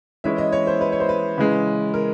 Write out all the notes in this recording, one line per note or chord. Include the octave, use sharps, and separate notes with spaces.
E3 G#3 C#4 E4 E5
D#5
C#5
C5
B4
C#5
C5
B4
C#3 E3 G#3
A#4